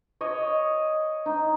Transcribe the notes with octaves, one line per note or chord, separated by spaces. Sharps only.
C#5 D#5
D#4